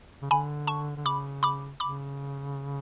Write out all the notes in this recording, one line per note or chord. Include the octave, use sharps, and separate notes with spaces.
C#3
D3 G#5 B5
A5 C#6
D3
C#3 B5 D6
B5 D6
C#3 B5 D6